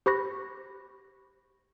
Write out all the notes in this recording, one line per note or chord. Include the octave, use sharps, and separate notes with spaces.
G4 C5 B5 C#6 F#6 A#6